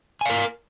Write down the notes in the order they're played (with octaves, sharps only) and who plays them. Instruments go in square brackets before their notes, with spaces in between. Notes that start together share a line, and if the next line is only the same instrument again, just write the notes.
[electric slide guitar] G#5
F5
A#4